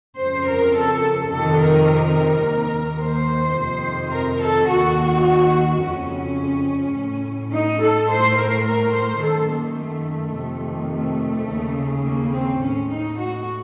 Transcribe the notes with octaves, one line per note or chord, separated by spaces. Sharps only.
F2 C#3 C5
A#4
A4
F2 C3 D#3 A4
A#4
A#4
D#2 D#3
C5
F2 C3 D#3
A#4
A4
D#2 D#3 F#4
F2 C#3 C#4
A2
D#4
A4
A2 C5
A#4
A#4
C5
F#2 D#3 A4
A#3
A3
F2 C3 D#3
A3
D#2 C#3
A#3
C4
A2 C#4
D#4
F#4